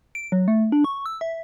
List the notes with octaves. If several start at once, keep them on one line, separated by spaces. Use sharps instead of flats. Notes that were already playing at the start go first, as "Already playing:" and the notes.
D7
F#3
A3
D4
C#6
E6
E5